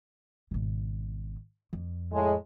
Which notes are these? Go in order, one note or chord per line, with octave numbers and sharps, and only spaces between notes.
G#1 B2
F2
A2 G#3